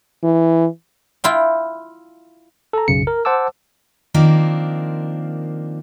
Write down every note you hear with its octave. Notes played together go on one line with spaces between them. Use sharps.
E3
E4 F4 G5
A4 A#5
B1 F#2 C#3 C#7
A#4
C5 F#5 A5 D6 E6
D#3 F3 A#3 C4 D4